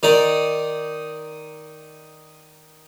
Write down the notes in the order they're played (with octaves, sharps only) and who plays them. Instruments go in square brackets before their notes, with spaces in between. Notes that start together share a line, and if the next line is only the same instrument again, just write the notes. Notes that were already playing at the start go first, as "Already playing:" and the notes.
[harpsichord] D#3 D#4 D5